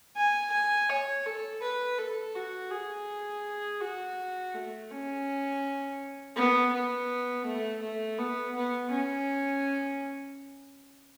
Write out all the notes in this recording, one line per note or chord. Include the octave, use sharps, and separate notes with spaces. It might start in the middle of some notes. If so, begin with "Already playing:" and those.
G#5
G#5
C#5
A4
B4
A4
F#4
G#4
F#4
A3
C#4
B3
B3
A3
A3
B3
B3
C#4